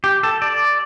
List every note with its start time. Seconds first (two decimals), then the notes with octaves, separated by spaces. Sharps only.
0.04 G4
0.23 A4
0.42 D5